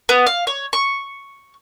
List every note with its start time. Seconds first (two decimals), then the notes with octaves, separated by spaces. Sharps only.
0.09 B3
0.27 F5
0.47 C#5
0.73 C#6